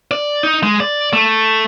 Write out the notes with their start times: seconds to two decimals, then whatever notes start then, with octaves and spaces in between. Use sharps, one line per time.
0.11 D5
0.43 D#4
0.63 G#3
0.80 D5
1.13 A3